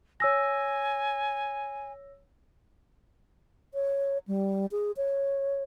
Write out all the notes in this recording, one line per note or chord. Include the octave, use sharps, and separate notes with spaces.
C#5 G#5 E6 A#6
C#5
G3
G#4
C#5